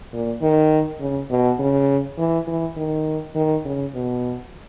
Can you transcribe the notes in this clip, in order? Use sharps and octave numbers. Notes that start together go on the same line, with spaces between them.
A#2
D#3
C#3
B2
C#3
E3
E3
D#3
D#3
C#3
B2